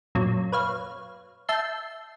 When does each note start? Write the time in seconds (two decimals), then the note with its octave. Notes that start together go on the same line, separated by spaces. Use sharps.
0.15 F#2 A#2 F#3
0.52 B4 C#5 F5
1.49 E5 A5 G6 C7